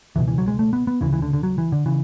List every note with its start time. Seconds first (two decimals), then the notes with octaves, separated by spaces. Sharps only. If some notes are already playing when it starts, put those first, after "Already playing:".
0.16 C#2 B2 E3
0.28 E3
0.38 F#3
0.48 G#3
0.59 A3
0.73 B3
0.87 B3
1.01 D2 C#3 E3
1.13 E3
1.22 D3
1.33 D3
1.43 F#3
1.58 E3
1.72 D3
1.86 C#3 E3